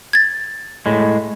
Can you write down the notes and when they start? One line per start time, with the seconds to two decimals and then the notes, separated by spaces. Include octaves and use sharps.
0.13 G#6 A6
0.86 A2 G#3